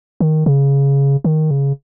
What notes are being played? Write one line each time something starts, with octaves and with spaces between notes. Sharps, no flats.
D#3
C#3
D#3
C#3